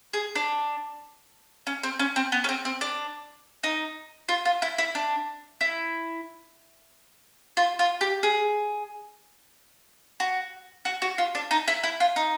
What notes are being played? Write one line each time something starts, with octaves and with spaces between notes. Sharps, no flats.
G#4
D4
C#4
C4
C#4
C4
B3
C#4
C4
C4
D4
D#4
F4
F4
E4
E4
D4
E4
F4
F4
G4
G#4
F#4
F#4
F#4
F4
D4
D#4
E4
E4
F4
D#4